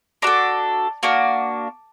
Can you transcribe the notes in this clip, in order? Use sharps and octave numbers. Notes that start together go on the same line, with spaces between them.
D4 F#4 A4 A#5 D6
A#3 D4 F#4